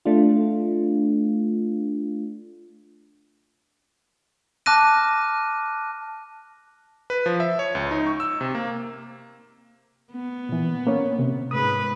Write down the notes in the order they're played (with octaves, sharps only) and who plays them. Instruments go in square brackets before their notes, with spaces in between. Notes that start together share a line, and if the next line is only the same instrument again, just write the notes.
[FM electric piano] A3 D4 F4
[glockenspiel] A5 D6 F6 F#6 A#6 D#7
[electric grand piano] B4
F3
E5
C#5
C#2
D#4
C#6
E6
C3
A#3
[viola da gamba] B3
[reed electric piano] A#2 E3
A#3 C#4 C#5
C3
[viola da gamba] G#2 B4 [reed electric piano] D#6